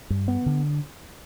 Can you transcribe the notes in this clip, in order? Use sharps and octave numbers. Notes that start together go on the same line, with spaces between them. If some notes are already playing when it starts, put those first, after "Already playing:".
G2
B3
D3